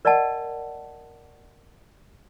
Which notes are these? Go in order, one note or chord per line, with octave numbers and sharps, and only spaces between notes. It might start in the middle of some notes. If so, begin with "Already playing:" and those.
A#4 D5 D#5 F#5 A5